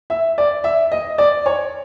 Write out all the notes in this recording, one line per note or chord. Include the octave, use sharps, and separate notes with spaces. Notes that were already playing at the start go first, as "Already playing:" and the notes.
E5
D5
E5
D#5
D5
C#5